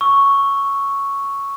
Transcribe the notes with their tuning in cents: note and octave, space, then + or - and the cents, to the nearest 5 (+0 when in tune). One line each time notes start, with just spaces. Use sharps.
C#6 +0 E6 +0